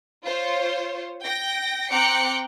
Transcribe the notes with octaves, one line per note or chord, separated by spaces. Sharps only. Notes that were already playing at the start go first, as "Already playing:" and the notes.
F4 C5 C#5
G5 A#6
C4 G5 A#5 D6 F#6 C#7